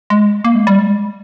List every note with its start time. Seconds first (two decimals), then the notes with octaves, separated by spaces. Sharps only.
0.10 G#3
0.44 A#3
0.55 G#3
0.67 G3
0.78 G#3